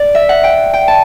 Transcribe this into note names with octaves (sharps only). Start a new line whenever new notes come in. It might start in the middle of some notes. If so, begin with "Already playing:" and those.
Already playing: D5
E5
F#5
G5
G5
A5